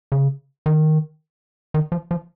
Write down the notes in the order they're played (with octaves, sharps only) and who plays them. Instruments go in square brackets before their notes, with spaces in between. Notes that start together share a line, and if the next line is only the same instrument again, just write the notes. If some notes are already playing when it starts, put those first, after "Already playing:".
[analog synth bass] C#3
D#3
D#3
F3
F3